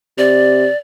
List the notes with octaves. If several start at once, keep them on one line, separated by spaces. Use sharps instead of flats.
C3 D5